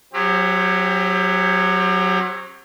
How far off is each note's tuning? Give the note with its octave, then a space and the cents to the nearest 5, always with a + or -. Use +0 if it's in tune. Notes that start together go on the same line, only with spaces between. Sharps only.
F#3 +0 C4 +35 G4 +35